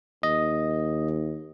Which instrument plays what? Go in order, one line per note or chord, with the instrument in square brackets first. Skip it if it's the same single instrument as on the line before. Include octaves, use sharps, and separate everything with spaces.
[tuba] D#2 [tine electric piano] D#5